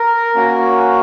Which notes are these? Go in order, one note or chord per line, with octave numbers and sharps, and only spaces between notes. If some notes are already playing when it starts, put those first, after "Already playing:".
Already playing: A#4
A#3 C#4 F#4